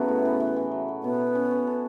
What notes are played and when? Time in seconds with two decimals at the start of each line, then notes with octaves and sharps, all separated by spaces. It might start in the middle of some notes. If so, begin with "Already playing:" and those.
Already playing: C#3 F#3 A3 B3 E4 C#5
0.08 A2
0.25 E3
0.40 E3
0.56 E3
0.72 F#3
0.88 F#3
1.03 B2 B3
1.20 E4
1.35 C#4
1.51 C#4
1.67 A4